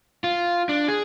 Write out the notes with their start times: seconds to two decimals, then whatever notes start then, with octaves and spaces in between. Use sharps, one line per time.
0.24 F4
0.69 D4
0.88 G#4